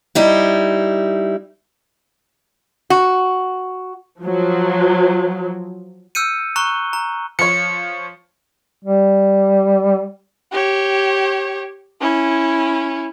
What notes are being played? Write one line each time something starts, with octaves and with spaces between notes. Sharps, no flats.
G3 D#4 E4
F#4
F3 F#3
E6 F6 G6 C#7 D#7
A#5 C#6 F#6 G7
A#5
F3 C#5 C#7
G3
G4 C#5
C#4 E4